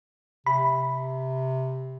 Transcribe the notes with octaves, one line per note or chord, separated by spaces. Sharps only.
C3 B5